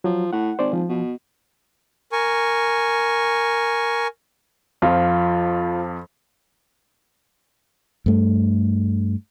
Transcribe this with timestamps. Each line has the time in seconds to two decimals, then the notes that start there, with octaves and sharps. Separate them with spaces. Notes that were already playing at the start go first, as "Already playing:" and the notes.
0.04 F3 F#3
0.33 A2 F#5
0.59 G#1 C5 D5
0.73 F3
0.89 B2
2.12 A#4 G#5 C#6
4.82 F2 F3 F4
8.06 G2 A3